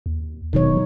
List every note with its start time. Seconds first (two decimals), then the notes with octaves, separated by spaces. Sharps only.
0.06 D#2
0.53 D#1 B2 D#3 F#3 D#4 C#5